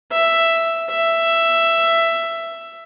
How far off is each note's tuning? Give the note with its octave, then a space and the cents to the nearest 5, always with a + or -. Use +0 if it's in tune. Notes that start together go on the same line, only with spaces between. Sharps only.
E5 +5
E5 +10